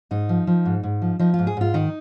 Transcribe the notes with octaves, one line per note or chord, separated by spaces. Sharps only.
G#2 D#4
F3
F3
G#2
G#2
F3
F3 D#4
G#2 F4
G#4
G#2 F4
D#3 D#4